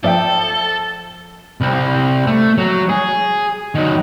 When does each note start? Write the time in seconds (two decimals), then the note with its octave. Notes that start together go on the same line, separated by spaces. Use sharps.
0.04 F3 A4 D5 E5 G5
1.61 C2 C4
2.27 A3
2.58 F#3
2.89 G#4
3.75 D#3 F#3